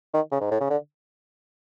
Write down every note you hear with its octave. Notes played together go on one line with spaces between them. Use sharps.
D#3
C#3
G#2
A2
C#3
D3